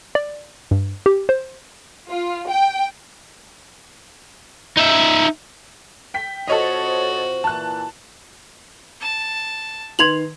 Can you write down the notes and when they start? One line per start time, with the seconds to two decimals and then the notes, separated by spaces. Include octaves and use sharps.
0.15 D5
0.71 G2
1.06 G4
1.29 C5
2.11 F4
2.48 G5
4.77 D#4 E5
6.14 G5 B6
6.48 C3 F4 F#4 A4 C5 C#5 D#5
7.44 A#2 E3 A5 F#6
9.01 A5
9.99 D#3 B4 C6 G#6 F7 F#7